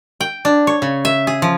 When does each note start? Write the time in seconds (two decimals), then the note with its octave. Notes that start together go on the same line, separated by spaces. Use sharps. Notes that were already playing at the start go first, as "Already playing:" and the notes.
0.21 G5
0.45 D4
0.67 C#5
0.82 C#3
1.05 E5
1.27 G#4
1.42 F3